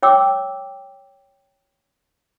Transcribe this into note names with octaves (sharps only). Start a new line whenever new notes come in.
C#5 G5 D6 E6